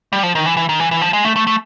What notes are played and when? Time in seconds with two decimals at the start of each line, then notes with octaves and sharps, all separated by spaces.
0.13 G3
0.23 F3
0.35 D#3
0.46 E3
0.57 E3
0.69 D#3
0.80 E3
0.91 E3
1.02 F3
1.13 G#3
1.24 A3
1.36 A3
1.47 A3